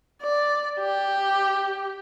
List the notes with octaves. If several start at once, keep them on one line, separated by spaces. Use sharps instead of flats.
D5
G4